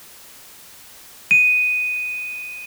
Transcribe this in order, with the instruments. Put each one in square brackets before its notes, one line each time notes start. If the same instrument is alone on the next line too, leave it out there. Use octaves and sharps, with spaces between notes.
[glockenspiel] D#7